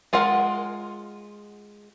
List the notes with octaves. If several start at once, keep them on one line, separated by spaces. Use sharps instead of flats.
G#3 F4 A#4 F#5